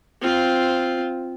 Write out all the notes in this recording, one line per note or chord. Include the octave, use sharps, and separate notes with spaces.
C4 F4